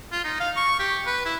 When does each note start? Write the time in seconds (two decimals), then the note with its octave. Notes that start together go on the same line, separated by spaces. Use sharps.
0.12 F4
0.24 D#4
0.40 F5
0.56 C#6
0.79 G4
1.06 B4
1.26 E4